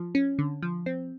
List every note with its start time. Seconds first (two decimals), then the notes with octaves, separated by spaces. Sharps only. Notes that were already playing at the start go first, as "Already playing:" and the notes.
Already playing: F3
0.15 C#4
0.39 D3
0.63 F3
0.86 C4